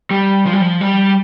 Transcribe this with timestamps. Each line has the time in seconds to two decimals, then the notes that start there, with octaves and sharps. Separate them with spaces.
0.11 G3
0.46 F3
0.53 G3
0.61 F3
0.81 G3